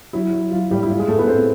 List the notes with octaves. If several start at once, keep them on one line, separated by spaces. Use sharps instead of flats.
F#3 E4
F#3
F#3 F4
A2 G3 G4
E4
A2 F4
G#3 G#4
A2 A3 A4
B3 B4
A2 C4 C5